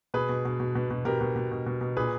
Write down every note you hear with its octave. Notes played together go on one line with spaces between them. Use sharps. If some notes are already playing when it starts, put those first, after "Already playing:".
B2 G#4 B4
B2
B2
B2
B2
B2
B2 G4 A#4
B2
B2
B2
B2
B2
A#2 G#4 B4